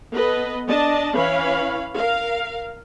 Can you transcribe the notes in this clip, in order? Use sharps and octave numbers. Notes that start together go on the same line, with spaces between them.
B3 A4 B4 D#5
D4 D5 D#5 A5
E3 C#4 B4 C#5 F5 B5
A#4 F5